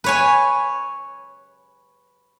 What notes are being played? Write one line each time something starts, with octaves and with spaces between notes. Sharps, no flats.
B4 C#5 G#5